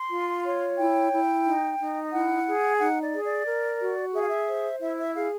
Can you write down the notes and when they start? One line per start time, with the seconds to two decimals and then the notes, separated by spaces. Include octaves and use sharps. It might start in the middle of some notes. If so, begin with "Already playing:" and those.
Already playing: C6
0.11 F4
0.45 C#5
0.78 E4 G5
1.12 E4
1.45 D#4
1.79 D#4
2.12 E4 F#5
2.46 G#4
2.79 D#4 F#5
3.02 D5
3.13 G#4
3.24 D5
3.47 A#4
3.80 F#4
4.13 G#4 E5
4.21 F5
4.28 E5
4.47 C5
4.80 E4 E5
4.98 E5
5.14 G#4 F5